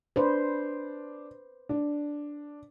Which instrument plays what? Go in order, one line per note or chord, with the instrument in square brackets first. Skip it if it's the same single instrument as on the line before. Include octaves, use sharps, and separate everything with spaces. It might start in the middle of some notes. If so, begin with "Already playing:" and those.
[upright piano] D4 [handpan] B4 C5
[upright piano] D4